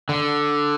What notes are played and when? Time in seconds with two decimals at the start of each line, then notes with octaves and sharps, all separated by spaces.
0.09 D3